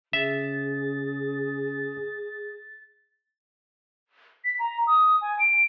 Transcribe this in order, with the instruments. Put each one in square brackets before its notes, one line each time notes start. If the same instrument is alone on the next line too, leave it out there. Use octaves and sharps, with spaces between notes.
[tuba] C#3 [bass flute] G#4 [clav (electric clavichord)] E5 [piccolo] A6
[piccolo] B6
A#5
D#6
G#5
D7